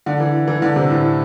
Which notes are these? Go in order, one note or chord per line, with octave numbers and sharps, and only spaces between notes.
D3
E3
E3
D3
C3
A2